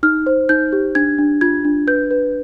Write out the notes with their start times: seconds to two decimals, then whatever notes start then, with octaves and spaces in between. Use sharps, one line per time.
0.03 D#4 F6
0.26 C5
0.49 D#4 G6
0.72 G4
0.95 D4 G#6
1.18 D4
1.41 F4 G#6
1.65 D4
1.87 B4 G6
2.11 B4